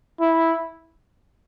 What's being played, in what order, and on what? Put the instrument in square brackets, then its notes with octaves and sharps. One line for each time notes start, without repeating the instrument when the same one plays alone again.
[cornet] E4